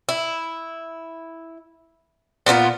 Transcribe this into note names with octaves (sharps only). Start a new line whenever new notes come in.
E4
A#2 B3 D4 F4